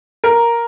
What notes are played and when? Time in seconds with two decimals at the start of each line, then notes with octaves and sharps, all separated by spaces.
0.24 A#4